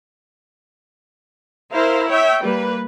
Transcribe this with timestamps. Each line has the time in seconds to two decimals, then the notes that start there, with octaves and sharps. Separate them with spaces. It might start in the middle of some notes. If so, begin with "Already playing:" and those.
1.71 E4 A#4 C5 F5
2.08 C#5 E5 G5
2.42 G3 A#3 B4